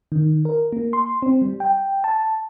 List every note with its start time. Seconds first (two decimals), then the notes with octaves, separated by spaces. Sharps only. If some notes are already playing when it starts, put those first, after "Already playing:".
0.12 D#3
0.45 A#4
0.72 A#3
0.93 C6
1.22 C4
1.42 G3
1.60 G5
2.04 A5